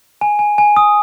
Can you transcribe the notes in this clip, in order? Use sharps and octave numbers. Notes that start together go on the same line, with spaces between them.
G#5
G#5
G#5
D#6